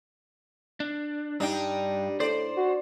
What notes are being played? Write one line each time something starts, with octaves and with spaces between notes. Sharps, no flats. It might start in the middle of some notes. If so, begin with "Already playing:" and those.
D4
G2 G3 D4 D#4 G5
A2 C5 D5
F#4